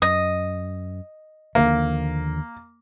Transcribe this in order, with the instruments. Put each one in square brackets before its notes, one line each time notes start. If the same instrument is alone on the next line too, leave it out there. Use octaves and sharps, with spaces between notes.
[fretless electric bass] F#2 [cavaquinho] D#5
[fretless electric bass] D#2 D3 F3 [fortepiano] A#3